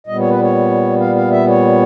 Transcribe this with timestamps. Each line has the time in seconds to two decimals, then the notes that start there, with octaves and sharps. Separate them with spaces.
0.07 A#2 G3 B3 D#5
0.19 C#5
0.30 B4
0.42 C#5
1.00 F5
1.16 F5
1.31 E5
1.47 C#5